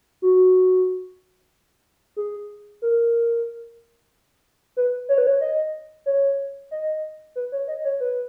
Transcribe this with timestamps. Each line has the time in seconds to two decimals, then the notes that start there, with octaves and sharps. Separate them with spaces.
0.22 F#4
2.16 G#4
2.82 A#4
4.77 B4
5.09 C#5
5.18 B4
5.27 C#5
5.41 D#5
6.06 C#5
6.71 D#5
7.36 B4
7.52 C#5
7.68 D#5
7.84 C#5
8.00 B4